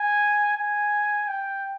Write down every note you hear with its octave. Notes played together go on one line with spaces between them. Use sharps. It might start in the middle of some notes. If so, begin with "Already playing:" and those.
Already playing: G#5
G#5
G5